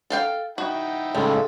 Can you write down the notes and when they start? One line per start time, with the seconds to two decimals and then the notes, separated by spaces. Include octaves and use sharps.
0.10 A4 F5 G5
0.58 D#4 E4 F#4 G5
1.15 A2 C#3 G3 G#3 A4